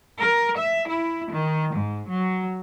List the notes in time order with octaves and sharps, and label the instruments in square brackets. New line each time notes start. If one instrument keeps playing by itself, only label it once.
[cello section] A#4
E5
E4
D#3
G#2
F#3